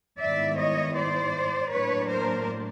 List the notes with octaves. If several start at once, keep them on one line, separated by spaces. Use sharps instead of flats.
G#2 D#3 G3 B3 E4 D5 E5
C#5 D#5
C5 D5
A2 F#3 A#3 D4 B4 C#5
A#4 C5